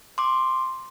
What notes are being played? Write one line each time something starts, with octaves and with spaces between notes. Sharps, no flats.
C6 D6